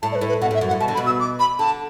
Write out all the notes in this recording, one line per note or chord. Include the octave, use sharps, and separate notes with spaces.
A2 A5
D5
B4
A2
B4
B2 F#5
A2
E5
F#2
F#5
A2
B2 A5
D3
B5
B2
E6
D6
B5
D3 A5